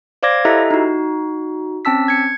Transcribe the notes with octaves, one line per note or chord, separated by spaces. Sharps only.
C5 D5 F5 D6 G#6 A#6
E4 G4 A4 D#5 E5 A#5
D#4 F#4
C4 C#4 A5 E6 B6
G#6 C#7